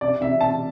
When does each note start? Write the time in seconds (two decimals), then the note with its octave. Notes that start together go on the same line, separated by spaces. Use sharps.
0.01 C3 D5
0.21 C3 E5
0.41 C3 A5